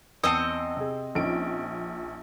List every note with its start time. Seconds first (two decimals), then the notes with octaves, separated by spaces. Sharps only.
0.24 E2 C4 D#5 A5 E6 C#7
0.77 C3 G#4
1.15 A#1 F3 C#4 D#4 D7